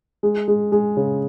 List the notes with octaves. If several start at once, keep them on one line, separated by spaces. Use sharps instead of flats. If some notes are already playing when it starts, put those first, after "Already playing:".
G#3
G#3
G#3
C#3